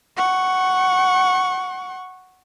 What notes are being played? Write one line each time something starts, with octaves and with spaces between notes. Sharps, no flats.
F#5 C#6